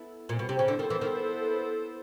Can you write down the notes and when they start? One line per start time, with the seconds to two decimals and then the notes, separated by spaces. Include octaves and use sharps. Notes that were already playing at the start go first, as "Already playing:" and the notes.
Already playing: B3 E4 A4
0.29 A#2
0.39 B2
0.49 C3
0.59 C#3
0.68 D3 B3 E4 A4 C5
0.79 D#3
0.90 E3
1.01 D#3